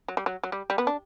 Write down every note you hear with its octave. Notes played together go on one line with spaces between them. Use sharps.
F#3
G3
F#3
F#3
G3
G3
B3
D4